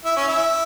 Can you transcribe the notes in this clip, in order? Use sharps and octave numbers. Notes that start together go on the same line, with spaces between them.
E4
C#4
E4